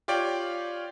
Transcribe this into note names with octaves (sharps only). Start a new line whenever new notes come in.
F4 G4 C#5 D5 G5